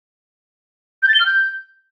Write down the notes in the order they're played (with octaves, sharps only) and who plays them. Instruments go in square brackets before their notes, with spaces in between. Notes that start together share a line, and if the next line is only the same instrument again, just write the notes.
[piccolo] G6
A6
G7
F6
G6